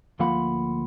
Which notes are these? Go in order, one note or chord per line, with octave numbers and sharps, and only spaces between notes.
D2 F3 A#3 F4 F#5 B5